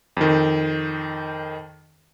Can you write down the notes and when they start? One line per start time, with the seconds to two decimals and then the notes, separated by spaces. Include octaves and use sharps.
0.17 F2 D#3